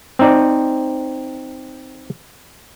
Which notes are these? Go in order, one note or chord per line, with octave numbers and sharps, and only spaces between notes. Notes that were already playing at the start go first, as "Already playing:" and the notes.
C4 D#4 D5